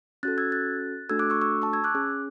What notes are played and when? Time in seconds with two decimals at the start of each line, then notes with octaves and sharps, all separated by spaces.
0.23 C#4 F#4 A4 F#6 A6
0.38 E6 G#6
0.52 F#6 A6
1.10 A3 D4 F#4 A4 E6 G#6
1.19 D6 F#6
1.30 C#6 E6
1.41 C#6 E6
1.62 A5 C#6
1.73 E6 G#6
1.84 D6 F#6
1.95 C#4 G#4